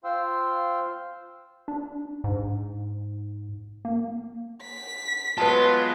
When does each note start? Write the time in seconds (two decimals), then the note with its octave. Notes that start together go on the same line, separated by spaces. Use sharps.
0.04 F4 C5 F5 G5 C6 E6
1.68 D4
2.24 G#2
3.85 A#3
4.62 B6
5.38 F#3 G#3 B3 F4 B4 A5